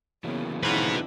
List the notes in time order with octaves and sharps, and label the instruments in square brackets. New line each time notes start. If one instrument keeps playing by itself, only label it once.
[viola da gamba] C#3 B3 [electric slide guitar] E3 F#3 A#3
[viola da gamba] F2 D3 E4 [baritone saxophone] G#2 [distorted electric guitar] F#4 B4